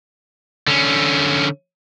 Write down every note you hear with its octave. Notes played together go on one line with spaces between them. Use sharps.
D3 C#4